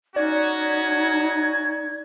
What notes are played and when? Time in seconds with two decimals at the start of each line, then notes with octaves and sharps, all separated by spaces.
0.16 C#4 D#4 F#4 D5 G#6